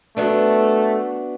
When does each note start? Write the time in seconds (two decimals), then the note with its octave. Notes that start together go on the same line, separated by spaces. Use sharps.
0.17 F#3 A3 B3 D4